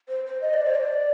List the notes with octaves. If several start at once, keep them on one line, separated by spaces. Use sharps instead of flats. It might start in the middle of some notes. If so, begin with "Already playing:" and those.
C5
C5
D#5
D5
C5
D5